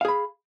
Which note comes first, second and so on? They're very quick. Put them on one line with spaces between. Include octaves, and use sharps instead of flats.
F5 G#4 B5